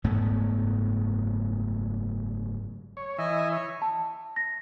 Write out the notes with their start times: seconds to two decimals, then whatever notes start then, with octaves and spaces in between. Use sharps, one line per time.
0.04 F#1 G#2 A3 B3
2.97 C#5
3.18 E3 D#5 E5 G#5
3.51 C#5
3.82 A5
4.36 A#6